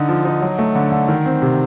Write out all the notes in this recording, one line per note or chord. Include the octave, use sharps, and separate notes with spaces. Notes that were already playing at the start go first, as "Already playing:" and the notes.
Already playing: D3 D#4
F3
D#4
F#3
A3
D3
D3
D#3
C4
C3